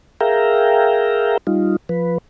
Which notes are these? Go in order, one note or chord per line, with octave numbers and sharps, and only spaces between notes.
G#4 A#4 E5 F5 G5 A#5
G3 D#4 F4
F3 B4